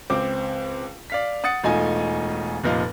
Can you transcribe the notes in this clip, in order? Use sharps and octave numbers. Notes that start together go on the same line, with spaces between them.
C#2 C4 D6
D5 F5 B6
F#5 D#6 A6 C#7
E1 A3 D#4 F4 G#5
F1 A#2 F3 D#4 F5